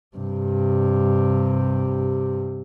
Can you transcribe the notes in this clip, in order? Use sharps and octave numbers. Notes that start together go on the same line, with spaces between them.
G2 C3